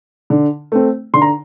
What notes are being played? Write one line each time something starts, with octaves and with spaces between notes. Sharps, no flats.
D3
A3 C4
D3 C6
A#5